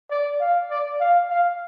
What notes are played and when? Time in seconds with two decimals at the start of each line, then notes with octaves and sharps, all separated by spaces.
0.11 D5
0.41 F5
0.70 D5
1.00 F5
1.30 F5